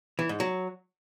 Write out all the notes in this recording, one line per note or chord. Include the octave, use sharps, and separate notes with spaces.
E3
G#2
F#3